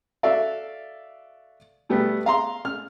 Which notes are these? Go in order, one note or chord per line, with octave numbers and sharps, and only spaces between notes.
F#4 A4 D5 E5 F5
B2 G3 A3 B3 G4
F5 A#5 C6
F6